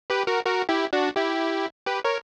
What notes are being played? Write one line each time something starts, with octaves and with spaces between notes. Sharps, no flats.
G4 B4
F#4 A#4
F#4 A#4
E4 G4
D4 F#4
E4 G4
G4 B4
A#4 C#5